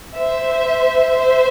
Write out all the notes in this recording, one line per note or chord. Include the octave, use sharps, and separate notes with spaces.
C5 E5
C5 E5